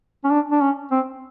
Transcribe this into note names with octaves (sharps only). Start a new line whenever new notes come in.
C#4
D4
D4
C#4
C4